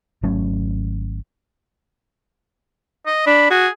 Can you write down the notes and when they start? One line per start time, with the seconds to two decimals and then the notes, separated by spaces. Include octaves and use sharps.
0.23 G#1 F#3 A3 C#4
3.06 D#5
3.27 D4 B5
3.51 F#4 G#4